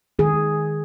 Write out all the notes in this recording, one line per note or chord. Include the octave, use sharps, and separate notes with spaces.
D#3 G#4